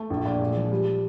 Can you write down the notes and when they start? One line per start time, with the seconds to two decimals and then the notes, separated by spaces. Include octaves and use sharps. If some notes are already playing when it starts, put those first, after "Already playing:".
Already playing: A3
0.10 A#1
0.26 A#2
0.41 G#3
0.56 F3
0.72 G3